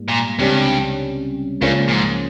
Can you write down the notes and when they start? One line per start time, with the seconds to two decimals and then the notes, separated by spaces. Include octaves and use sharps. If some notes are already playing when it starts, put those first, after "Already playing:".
Already playing: G#2 G3 A#3
0.08 A#2
0.39 C#2 G2 C3 G3 C#4
1.61 C#2 G2 C#3 F3 A#3 C#4
1.88 A#2
1.93 G#2